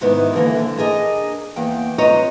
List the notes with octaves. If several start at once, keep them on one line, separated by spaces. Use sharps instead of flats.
G#2 C3 D#3 B3 E4
B2 D3 E3 A#3
F2 D3
D4 G#4 A#4 D#5
E2 A#3 G5
C4 F4 B4 C#5 D#5 A#5